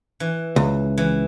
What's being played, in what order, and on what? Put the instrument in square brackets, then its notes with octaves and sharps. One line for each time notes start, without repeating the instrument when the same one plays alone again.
[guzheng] E3
[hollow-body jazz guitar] C#2
[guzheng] E3